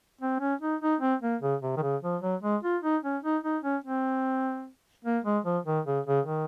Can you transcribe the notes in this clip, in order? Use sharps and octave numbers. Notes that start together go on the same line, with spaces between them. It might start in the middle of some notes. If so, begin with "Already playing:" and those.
C4
C#4
D#4
D#4
C4
A#3
C#3
C3
D#3
C#3
F3
F#3
G#3
F4
D#4
C#4
D#4
D#4
C#4
C4
A#3
G#3
F3
D#3
C#3
C#3
D#3